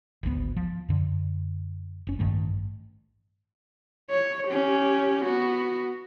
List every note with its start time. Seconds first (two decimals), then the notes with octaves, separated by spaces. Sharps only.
0.23 G#1 D2 C#3 B3
0.56 F3
0.89 F#2 D3
2.07 F1 C#4
2.19 A1 G2 D#3 A3
4.11 C#5
4.48 C#4 G4
5.24 B3 F#4